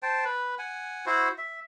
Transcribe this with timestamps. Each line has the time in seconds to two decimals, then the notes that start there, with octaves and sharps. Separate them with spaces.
0.03 C5 G5 A5
0.25 B4
0.59 F#5 G#5
1.06 E4 F#4 C5
1.38 E5